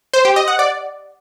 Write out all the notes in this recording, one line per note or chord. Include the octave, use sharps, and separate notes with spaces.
C5
G4
D#5
F#5
D5